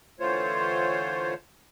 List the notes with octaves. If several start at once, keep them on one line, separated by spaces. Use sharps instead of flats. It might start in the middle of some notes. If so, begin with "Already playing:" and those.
D3 E3 A3 F4 C5 C#5